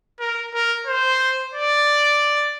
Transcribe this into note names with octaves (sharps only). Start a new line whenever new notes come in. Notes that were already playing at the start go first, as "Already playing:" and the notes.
A#4
A#4
C5
D5